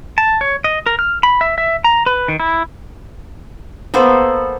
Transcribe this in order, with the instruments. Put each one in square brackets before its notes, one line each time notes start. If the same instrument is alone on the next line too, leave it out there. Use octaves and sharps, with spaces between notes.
[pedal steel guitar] A5
C#5
D#5
A#4
F6
B5
E5
E5
A#5
B4
D#3
E4
[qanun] A#3 B3 A4 C5